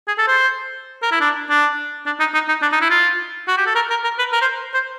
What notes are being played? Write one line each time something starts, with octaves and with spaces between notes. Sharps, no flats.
G#4
A4
C5
A#4
E4
D4
D4
D4
D#4
D#4
D#4
D4
D#4
E4
F4
F#4
G4
A4
A#4
A#4
A#4
B4
A#4
C5
C5